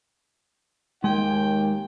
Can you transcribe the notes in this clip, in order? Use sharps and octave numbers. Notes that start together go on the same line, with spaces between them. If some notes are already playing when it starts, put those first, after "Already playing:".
D#2 G#3 D#4 A#4 G5 G#5